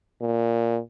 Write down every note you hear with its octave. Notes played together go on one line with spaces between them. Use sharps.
A#2